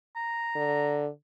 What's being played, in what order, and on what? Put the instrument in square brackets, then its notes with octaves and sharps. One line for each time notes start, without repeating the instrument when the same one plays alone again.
[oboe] A#5
[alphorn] D3